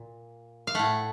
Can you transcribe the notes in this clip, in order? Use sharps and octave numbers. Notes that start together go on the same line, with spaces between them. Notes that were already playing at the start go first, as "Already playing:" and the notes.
Already playing: A#2
F5
A2 A3 F#5